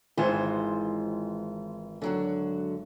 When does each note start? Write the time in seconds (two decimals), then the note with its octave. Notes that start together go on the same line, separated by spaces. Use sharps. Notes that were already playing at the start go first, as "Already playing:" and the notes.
0.17 G#1 E3 F4 C5 C#5
2.02 D3 F#3 F#4